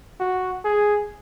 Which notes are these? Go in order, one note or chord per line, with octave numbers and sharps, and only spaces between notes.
F#4
G#4